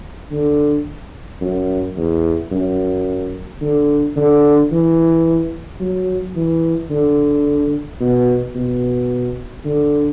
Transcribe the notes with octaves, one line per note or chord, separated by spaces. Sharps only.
D3
F#2
E2
F#2
D3
D3
E3
F#3
E3
D3
B2
B2
D3